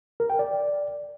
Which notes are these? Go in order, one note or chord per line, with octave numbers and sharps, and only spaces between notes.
A#4
G5
D5